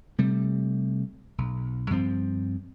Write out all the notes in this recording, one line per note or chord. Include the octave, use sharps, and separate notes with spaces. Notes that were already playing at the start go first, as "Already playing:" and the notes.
C3 G3 A3
B1
G2 F3 C4